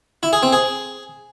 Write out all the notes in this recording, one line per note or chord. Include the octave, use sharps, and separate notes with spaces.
E4
G#4
C4
G#4